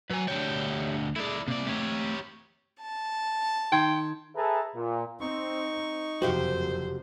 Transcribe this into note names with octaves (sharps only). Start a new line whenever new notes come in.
F#3 B4 G#5
D2 D4 G4 C#5 G5
A3 E4 G#4 D5
C3 A#3 D5
A3 C4 G4 C#5
A5
D#3 G5 C6 G#6
G#4 A4 B4 E5 A5 A#5
A#2
C4 D#4 C#6
F#1 F2 C3 F#4 G4 C5 F5